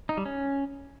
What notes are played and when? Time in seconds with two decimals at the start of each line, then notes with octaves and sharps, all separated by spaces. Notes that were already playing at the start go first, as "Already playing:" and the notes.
0.09 D#4
0.17 G3
0.26 C#4